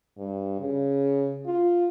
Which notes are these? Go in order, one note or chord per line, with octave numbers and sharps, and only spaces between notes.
G2
C#3
F4